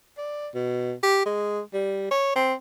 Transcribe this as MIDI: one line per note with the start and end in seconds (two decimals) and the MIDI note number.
0.18 0.49 74
0.55 0.94 47
1.03 1.25 67
1.26 1.61 56
1.74 2.11 55
2.11 2.35 73
2.36 2.54 60